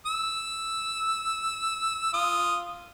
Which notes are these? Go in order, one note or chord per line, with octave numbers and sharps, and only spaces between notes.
E6
F4 D#6